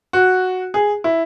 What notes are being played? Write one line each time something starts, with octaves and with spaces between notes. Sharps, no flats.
F#4
G#4
E4